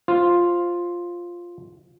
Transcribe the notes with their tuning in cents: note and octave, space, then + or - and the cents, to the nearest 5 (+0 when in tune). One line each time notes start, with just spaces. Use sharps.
F4 +0 C5 +5